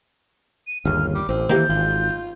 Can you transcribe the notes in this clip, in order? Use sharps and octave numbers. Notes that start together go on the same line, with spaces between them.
D#7
G1 D#2 C#3 F6
G3 D6
A1 C4
D#3 E3 A#3 G4 G6
G#1 F4